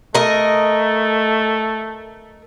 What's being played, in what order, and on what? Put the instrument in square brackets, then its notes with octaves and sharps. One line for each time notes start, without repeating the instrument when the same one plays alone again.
[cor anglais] A3 [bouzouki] A#4 D#5